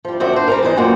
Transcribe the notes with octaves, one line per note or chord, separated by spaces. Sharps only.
F3 G3
F#2 D#3 C4 F#4 D5 E5
D4 C5
G3 C4 A#4
E3 B3 C5 D#5
F#2 A#2 A#3 F#4 G5 G#5